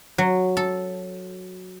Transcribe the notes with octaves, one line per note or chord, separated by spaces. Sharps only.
F#3
A4